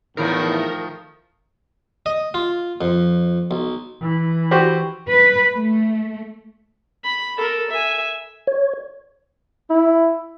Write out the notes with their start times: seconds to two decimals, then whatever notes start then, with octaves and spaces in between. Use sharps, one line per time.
0.17 E2 A2 D#3 F3 A3 A#4
2.06 D#5
2.34 F4
2.81 F2
3.51 B1
4.02 E3
4.51 F#4 G4 C5
5.08 B4
5.54 A3
7.04 B5
7.37 A4 A#4
7.70 E5 G#5
8.47 C#5
9.70 E4